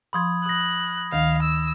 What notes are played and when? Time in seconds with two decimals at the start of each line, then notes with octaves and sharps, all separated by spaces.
0.13 F3 B5 C6 D#6 G#6
0.46 D#6 F#6 A#6
1.12 D2 D#3 F5
1.43 E6